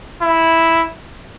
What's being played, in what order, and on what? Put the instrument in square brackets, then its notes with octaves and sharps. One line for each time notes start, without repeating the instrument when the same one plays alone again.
[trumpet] E4